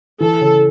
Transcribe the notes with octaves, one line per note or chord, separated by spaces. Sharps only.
E3 A4
C#3